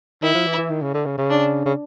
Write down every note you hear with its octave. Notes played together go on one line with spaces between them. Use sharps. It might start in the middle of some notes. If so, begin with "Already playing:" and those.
D#3 E4
F3
E3
E3
D#3
C#3
D3
C#3
C#3
D4
C#3